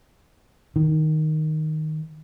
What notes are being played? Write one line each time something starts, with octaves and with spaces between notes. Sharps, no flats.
D#3